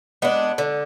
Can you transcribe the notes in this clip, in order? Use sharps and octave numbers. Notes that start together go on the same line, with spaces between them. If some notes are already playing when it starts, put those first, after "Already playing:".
G#3 B3 D4
D3